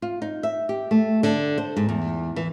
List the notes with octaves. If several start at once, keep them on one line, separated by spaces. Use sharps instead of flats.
F4
D#4
E5
G4
A3
D3
C5
G#2
E2
E3